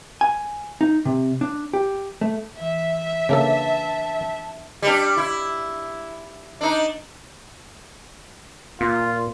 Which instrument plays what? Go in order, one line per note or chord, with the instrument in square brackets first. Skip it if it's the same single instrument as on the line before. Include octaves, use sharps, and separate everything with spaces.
[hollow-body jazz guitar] G#5
D#4
C3
D4
G4
A3
[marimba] E3 [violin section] E5
[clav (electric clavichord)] C#3 A#3 A4 [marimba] D4 B4 F5 [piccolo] A5
[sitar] G3 D4
E4
D4 D#4
[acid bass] A#2 [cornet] F4